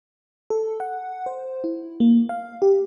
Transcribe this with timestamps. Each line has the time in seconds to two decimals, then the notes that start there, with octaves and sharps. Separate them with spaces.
0.50 A4
0.80 F#5
1.26 C5
1.64 E4
2.00 A#3
2.29 F5
2.62 G4